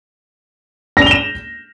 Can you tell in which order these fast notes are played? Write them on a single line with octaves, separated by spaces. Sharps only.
A#6 F7 G7 E7